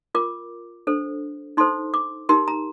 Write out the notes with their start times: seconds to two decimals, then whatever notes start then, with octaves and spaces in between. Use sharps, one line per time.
0.15 F4 A#4 D6
0.87 D4 A4 C5
1.57 D#4 A4 C5 C6
1.94 D6
2.29 D#4 G4 A#4 C6
2.48 A#5